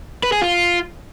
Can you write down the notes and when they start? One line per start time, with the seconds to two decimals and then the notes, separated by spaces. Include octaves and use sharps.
0.23 B4
0.32 G#4
0.42 F4